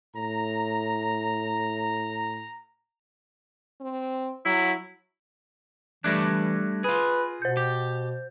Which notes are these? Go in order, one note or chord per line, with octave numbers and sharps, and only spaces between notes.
A2 A#5
C4
F#3 E4
E3 G3 A3 D4 F#6 G#6 A#6
F4 G#4 B4
B2 C5 G6
G4